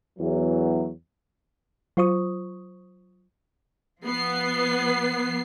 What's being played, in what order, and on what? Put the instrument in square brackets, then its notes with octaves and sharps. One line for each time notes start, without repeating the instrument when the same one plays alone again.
[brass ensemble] E2 E3 F#3
[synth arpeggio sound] F#3 F4 C5 C#6 D#6
[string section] F3 B3 C7